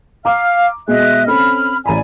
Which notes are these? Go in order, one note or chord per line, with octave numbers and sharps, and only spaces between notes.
F5 A#5 D6 F6
B2 G#3 D#5 E5 F#6
C4 C#4 A4 B5 F6
A1 D5 G#5 A#5 B5